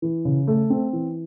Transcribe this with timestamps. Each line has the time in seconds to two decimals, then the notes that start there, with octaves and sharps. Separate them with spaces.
0.02 E3
0.25 C#3
0.47 A3
0.70 C4
0.93 E3